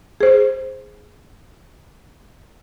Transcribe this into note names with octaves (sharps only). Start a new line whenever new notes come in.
G#4 C5